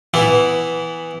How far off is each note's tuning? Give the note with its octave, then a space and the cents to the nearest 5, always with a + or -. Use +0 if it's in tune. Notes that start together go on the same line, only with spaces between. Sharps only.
E3 +0 B3 +10 E4 +0